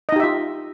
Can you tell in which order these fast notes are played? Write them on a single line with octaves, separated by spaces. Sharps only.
D#5 D#4 G4 E5 F4